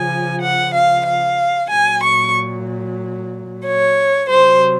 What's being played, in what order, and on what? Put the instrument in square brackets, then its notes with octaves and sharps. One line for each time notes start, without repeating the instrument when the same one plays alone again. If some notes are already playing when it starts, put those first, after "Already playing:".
Already playing: [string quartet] C#3 F3 G#5
F#5
F5
F5
A#2 F#3 G#5
C#6
C#5
C3 F#3 C5